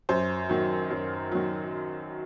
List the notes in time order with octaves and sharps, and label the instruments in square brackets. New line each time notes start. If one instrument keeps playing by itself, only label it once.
[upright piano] F#2 C5
D#3 F#3
F#2 A#4
D#3 F#3